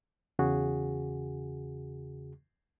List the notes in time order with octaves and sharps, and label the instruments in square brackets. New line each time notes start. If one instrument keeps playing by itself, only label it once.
[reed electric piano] E2 C#3 F#4 G#4